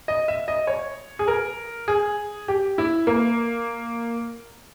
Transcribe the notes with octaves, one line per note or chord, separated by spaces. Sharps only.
D#5
E5
D#5
C#5
G#4
A#4
G#4
G4
E4
A#3